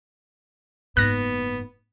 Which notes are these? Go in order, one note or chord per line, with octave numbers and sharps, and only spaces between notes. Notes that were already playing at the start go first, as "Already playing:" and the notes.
F#1 G#2 B3 F#6 A#6